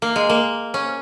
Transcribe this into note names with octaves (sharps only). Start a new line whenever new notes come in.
A#3
G#3
A#3
C#4